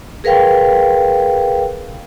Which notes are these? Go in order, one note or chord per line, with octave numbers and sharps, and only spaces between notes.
G#4 A#4 B4 F5 G5